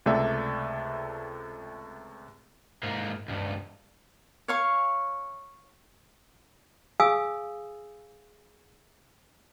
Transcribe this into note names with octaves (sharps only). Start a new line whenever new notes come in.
C#2 C3 A3 A4 D5 E5
G#2 A#3
C#2 G2
C#5 F5 C#6
G#4 F5 G#5 D#6 E6